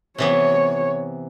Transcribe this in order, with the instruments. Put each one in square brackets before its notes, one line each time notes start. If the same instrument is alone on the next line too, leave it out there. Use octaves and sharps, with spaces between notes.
[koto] C3 E3 B3 [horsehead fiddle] C#5